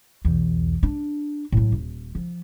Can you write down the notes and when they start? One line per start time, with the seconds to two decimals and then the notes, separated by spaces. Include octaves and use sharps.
0.25 B1 E2
0.83 D4
1.52 A2 F#3
1.72 D#1
2.15 F3